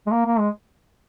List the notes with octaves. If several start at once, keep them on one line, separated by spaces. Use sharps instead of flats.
G#3
A#3
A#3
G#3